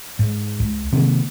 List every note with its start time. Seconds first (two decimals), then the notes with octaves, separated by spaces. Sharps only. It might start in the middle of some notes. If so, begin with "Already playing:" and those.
0.19 G#2
0.60 C#2
0.92 C3 D#3 F#3 A#3